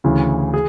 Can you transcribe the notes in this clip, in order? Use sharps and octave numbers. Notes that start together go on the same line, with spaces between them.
D2 C#3 E3
G#4